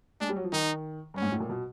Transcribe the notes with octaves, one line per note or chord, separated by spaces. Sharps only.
G#3 D4
G3
F#3
F3
D#3 D#4
G2 C#4
G#2
A2
A#2
B2